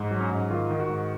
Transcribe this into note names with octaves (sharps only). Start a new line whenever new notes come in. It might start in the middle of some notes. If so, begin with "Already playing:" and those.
Already playing: G#2
F#3
C#4
G#2
D#3 F4
D#3
F#4
G#2